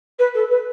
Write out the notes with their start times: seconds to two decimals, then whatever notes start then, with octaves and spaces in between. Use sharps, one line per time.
0.18 B4
0.34 A4
0.50 B4